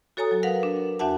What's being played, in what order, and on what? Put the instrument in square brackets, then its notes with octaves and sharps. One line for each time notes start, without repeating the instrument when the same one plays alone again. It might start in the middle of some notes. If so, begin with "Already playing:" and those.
[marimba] F#4 A4 C#5 G#5 A#5 D#6
F#3
A#4 B4 F5 F#5
D4
E2 D4 F#4 E5 F#5 A5